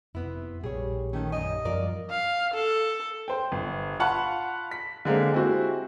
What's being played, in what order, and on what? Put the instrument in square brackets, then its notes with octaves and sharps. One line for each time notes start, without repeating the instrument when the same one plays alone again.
[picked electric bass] F1 [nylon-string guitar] C3 B3 E4
[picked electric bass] A#1 [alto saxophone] G3 [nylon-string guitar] G#4 C#5
[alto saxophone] D#3 [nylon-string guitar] A3 C#4
[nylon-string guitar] F#2 G3 G#5 [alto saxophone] D#5
[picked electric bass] F#2 F3 G3 [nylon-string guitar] F4 A#4 D5
[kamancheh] F5
A4
[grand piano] C5 G5
G1
F4 F5 F#5 A5 B5 C#6
B6
D3 G#3 A#3 C4
G#3 C4 E4 F#4 G4